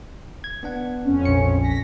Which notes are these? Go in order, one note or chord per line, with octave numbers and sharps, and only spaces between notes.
G#6
B3 D4 F#5
F2 C#4
A#1 C#7
A#6 B6